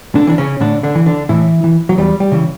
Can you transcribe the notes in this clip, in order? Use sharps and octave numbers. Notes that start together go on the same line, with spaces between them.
D3 D4
E3 D4
C#3 C#4
A2 D3 D4
D3 D4
E3
D3 D4
A2 E3 E4
E3
F#3
E2 G3
G3
C#3 E3